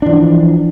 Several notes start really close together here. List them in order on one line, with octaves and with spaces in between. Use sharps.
D4 E3 F3